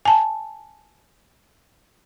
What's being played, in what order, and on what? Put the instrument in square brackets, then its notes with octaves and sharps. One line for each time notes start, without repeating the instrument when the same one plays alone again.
[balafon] G#5 A5